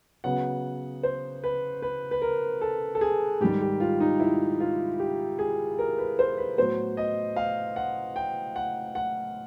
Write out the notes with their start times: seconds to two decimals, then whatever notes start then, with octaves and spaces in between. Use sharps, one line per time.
0.24 C#3 F#3 B3 F#5
1.03 C5
1.44 B4
1.82 B4
2.11 B4
2.22 A#4
2.61 A4
2.95 A4
3.01 G#4
3.40 G#2 D#3 G3 G4
3.61 G4
3.80 F4
4.00 D#4
4.20 E4
4.60 F4
4.99 G4
5.39 G#4
5.79 A#4
5.98 B4
6.19 C5
6.38 B4
6.58 A2 F#3 B3 C5
6.97 D#5
7.36 F5
7.76 F#5
8.16 G5
8.56 F#5
8.95 F#5